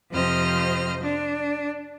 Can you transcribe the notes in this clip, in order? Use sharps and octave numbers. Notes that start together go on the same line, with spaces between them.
F2 C3 F3 C5 D#5 F6
D4